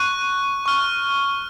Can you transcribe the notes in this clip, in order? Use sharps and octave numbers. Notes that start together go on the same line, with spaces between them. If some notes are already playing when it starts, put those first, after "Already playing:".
Already playing: C#6 F#6 D#7
C#6 F6